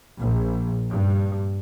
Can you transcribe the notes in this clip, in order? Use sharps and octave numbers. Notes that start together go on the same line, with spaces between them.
A#1
G2